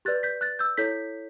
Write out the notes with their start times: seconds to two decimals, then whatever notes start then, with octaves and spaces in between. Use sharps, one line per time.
0.05 G4 B4 D5 F#6 A6
0.23 G6 B6
0.41 F#6 A6
0.59 E6 G6
0.77 E4 A4 C#5 G6 B6